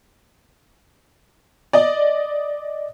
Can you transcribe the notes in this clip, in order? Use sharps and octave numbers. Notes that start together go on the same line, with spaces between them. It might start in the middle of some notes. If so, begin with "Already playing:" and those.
D5 D#5